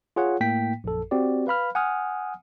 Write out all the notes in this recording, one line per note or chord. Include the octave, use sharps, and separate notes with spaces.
F4 G#4 C#5 F#5
A2 A#3 G5 B6
A#1 F#2 A4
C4 F#4 G4 D5
B4 F5 B5 F6
F#5 G#5 D#6 F6